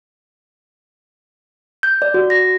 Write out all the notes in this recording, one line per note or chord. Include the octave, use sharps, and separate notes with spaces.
G6
D5
F#4
A#6